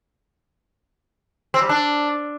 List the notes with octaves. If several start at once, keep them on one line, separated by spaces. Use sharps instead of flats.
C4
G3
D4